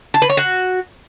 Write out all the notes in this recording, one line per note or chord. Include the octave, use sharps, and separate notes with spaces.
A5
B4
C#5
F#4